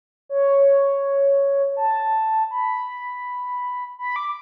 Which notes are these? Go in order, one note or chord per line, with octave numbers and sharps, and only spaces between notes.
C#5
A5
B5
B5
D6